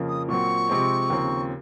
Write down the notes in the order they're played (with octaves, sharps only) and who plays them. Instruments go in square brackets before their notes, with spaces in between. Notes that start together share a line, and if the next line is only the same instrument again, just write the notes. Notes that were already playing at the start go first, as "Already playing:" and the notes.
Already playing: [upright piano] F2 C#3 F3 A#3
[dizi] D#6
[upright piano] A#2 F#3 C4 [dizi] C#6
[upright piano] C3 F3 G#3 C4
D#2 C#3 F3 C4